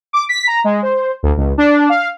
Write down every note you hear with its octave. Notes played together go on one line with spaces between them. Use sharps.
D6
B6
A#5
G#3
C5
D2
C#2
D4
F5